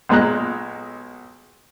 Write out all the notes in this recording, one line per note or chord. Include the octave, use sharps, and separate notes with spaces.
B1 A#2 G#3 A#5 F#6